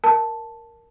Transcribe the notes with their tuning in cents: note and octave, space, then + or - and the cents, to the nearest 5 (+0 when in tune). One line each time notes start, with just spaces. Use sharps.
A#4 +0 A5 +0